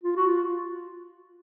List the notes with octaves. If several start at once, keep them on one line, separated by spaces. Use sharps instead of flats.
F4
F#4
F4